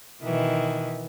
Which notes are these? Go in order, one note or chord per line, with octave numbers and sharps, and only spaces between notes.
B2 D#3 E3